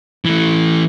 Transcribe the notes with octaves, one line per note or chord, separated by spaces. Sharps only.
E3 A3